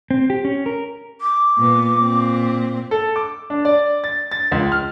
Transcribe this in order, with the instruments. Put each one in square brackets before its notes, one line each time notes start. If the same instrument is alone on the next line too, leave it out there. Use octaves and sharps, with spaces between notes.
[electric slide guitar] C4
G4
C#4
A#4
[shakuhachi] D6
[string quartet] A#2 B3
A#2 C4
[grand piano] A4
D6
D4
D5
A6
A6
C#2
F6